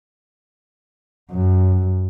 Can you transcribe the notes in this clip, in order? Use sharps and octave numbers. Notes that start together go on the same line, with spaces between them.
F#2